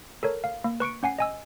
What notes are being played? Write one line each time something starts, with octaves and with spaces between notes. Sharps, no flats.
A4 A#4 C#5
F5
A#3
B4 C#6 C#7 D7
C#4 F#5 G#5 C7
D#5 G#5 E6